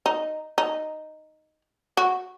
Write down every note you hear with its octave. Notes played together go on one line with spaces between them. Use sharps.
D#4
D#4
F#4